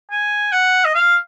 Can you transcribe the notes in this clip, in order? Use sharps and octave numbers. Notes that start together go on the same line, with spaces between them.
G#5
F#5
D#5
F5